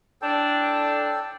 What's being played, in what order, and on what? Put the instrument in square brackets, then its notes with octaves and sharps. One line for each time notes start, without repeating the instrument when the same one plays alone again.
[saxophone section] A2 D4 [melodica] A4 G5